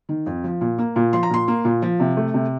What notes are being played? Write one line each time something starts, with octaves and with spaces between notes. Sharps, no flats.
D#3
F2
F3
A#2
A#3
A#2
F3 C6
A#5
A#2 C6
A#3
A#2
F3
C3
A3
C3